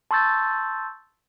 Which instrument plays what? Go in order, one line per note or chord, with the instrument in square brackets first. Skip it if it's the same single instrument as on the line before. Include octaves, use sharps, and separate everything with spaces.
[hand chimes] A5 C6 C#6 E6 G6 A6